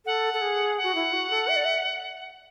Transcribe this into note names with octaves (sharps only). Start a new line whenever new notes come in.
A4 F#5
A4
G#4
F#5
F#4
E4
F#4
A4
E5
D5
E5